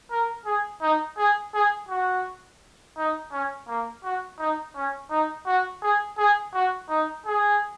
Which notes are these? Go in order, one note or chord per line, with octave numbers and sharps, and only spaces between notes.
A#4
G#4
D#4
G#4
G#4
F#4
D#4
C#4
A#3
F#4
D#4
C#4
D#4
F#4
G#4
G#4
F#4
D#4
G#4